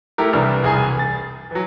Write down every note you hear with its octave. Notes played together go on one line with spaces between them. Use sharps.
A3 E4 G4 A#4
C2 E3 D4 F6
E1 C2 G#4 G#5
A6
E3 F#3